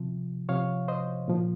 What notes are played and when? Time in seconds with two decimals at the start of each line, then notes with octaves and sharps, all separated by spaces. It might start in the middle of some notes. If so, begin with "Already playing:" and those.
Already playing: C3 F3
0.49 C3 F3 C#5 F5
0.88 C5 D#5
1.28 A#2 F3